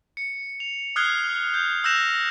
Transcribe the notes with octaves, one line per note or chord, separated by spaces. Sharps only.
C#7
F7
D#6 F6 F#6 G#6 C7 G7
G6
E6 F#6 G6 A#6 E7 F7